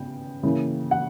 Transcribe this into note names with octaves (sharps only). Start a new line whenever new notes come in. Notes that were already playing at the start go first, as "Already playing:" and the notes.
Already playing: C#3 B3 G5
C#3 E3 A#3
F#5